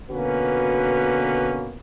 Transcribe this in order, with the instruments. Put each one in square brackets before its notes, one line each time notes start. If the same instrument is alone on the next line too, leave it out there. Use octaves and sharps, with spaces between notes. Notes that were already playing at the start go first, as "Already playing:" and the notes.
[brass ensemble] B2 D3 A#3 C#4 F#4 B4